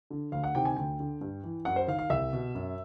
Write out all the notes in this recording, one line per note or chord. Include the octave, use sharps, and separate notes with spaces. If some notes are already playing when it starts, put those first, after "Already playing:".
D3
D2 F5
F#5
C3 D#3 G5
G#5
D2 G5
D3
G2
E3
F#2 F#5
C5
D#3 F5
F5
C2 E5
B2
F#2